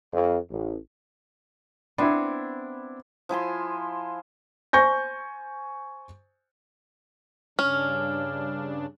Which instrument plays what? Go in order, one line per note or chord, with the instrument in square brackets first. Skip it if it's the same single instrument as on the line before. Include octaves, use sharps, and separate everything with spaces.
[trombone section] F2
A1
[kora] B3 C4 [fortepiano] D4 E4
[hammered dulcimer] F3 E4 G#5 C6
[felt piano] C5 G#5 C#6 G6 A#6
[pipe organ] G2 C#3 D4 [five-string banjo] C#4 [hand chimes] F6